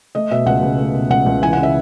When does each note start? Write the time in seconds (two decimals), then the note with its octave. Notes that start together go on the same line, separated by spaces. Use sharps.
0.15 A3 D#5
0.31 B2 E5
0.46 C#2 F#5
0.63 C#2
0.78 A3
0.95 B2
1.10 C#2 F#5
1.26 C#2
1.42 E3 G#5
1.53 C#3 F#5
1.63 E5